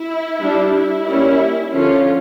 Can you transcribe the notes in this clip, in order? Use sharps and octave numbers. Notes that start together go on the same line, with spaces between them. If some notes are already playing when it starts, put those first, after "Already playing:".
Already playing: E4
G3 D4
E4
G3 A#3 C#4
D3 F3 C#4 F4